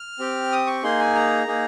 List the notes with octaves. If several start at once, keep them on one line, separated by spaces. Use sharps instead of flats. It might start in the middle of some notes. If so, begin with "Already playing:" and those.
Already playing: F6
C4 G4
D#6
C#6
A#3 D#4 G#4 C6
G#5
A#5
A#3 D#4 G#4